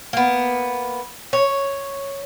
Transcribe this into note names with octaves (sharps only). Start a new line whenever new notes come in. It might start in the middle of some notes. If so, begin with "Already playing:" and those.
A#3 B3
C#5